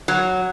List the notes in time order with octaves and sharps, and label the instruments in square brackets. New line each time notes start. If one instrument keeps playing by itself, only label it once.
[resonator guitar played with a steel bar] F#3